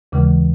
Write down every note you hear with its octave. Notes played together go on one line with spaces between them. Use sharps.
D#2 C#3 E3 G#3